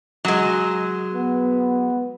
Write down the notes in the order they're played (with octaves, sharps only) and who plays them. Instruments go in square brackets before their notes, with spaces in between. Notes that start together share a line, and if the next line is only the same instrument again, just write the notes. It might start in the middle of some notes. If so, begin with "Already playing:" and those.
[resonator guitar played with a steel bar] F#3 G#3
[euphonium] B3